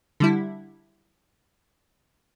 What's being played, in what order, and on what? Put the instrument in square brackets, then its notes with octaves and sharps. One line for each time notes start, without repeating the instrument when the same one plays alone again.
[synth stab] D3 G3 E4